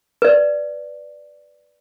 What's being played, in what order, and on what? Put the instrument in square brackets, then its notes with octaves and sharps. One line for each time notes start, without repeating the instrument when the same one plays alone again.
[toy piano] B4 D5